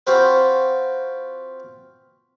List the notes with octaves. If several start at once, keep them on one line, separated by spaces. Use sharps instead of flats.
C4 F4 F#4 B4 C5